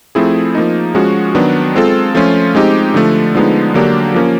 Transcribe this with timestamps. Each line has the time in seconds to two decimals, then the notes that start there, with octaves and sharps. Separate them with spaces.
0.15 F3 A3 C4 E4 G#4
0.55 F3 A#3 D#4
0.95 F3 G#3 C#4 F#4
1.35 D#3 F#3 B3 D4
1.75 G#3 C4 F4 A4
2.15 F3 A3 C#4 F4
2.55 G#3 C4 D#4 G4
2.94 D3 F3 A3
3.35 D3 F3 G#3 B3 D#4
3.74 D3 F#3 A#3 D4 G4
4.14 F3 A#3 C#4